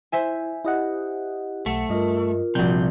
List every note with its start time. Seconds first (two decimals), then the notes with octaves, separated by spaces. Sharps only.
0.12 E4 C5 E5 G#5
0.65 E4 G4 D#5 F#5
1.66 B1 A3 F#5 C#7
1.89 G2 F4 A#4 D#5
2.55 A#1 C3 G3 F#4 G6